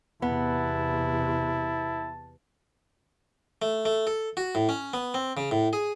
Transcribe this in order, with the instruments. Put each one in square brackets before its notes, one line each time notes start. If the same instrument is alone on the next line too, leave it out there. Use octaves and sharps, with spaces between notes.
[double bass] E2 C3 [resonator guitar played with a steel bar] B3 [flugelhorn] E4 [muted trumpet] A5
[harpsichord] A3
A3
A4
F#4
A2
C#4
B3
C4
C#3
A2
G#4